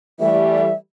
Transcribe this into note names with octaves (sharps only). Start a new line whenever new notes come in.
E3 G3 A3 E5